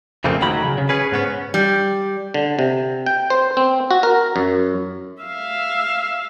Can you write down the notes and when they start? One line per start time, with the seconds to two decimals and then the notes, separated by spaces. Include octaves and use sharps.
0.24 F2 A#2 C#3 A3 A#3 C4
0.42 D2 D#3 F#3 B5
0.64 C#3
0.78 C#3
0.89 C#4 G#4 B4
1.12 G#2 B3 C#4
1.54 G3
2.34 D3
2.59 C3
3.06 G5
3.30 C5
3.57 C4
3.91 F#4
4.03 A#4
4.36 F#2
5.23 E5 F5